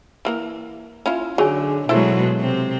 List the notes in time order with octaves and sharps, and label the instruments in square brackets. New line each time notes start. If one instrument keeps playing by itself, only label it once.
[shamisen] E3 A#3 A#4
C#4 E4 F4
[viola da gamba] D3 [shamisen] F#3 D#4 [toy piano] G#4 C#5 G#5
[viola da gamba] B2 F#3 G#3 [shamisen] E4 A4 C5
[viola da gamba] C3 C4